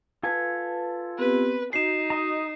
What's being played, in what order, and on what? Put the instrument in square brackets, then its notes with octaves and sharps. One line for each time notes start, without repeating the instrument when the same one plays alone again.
[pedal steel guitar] F4 A4 G#5 [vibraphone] B4 A5
[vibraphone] B3 C4 G4 [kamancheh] B4
[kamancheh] D#4 [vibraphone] F#4 [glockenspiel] C7 E7
[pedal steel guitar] D#5 A#5